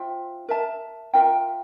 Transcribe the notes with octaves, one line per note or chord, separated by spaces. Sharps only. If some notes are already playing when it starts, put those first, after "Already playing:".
Already playing: F4 C5 E5 G5
A#4 E5 A5
F4 A#4 E5 G5